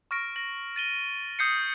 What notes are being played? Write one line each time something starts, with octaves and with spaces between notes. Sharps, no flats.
C#6 F6 A#6 D7
A#6 F#7
A6 D#7 G7
D#6 G6 C7 C#7